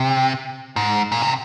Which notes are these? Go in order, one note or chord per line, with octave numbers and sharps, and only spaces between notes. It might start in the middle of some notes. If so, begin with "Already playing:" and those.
Already playing: C3
G#2
A#2
C3